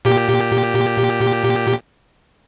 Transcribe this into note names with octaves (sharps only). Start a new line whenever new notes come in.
A#2 G4